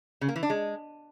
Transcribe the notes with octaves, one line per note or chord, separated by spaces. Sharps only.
C#3
A#3
E3
D4
G#3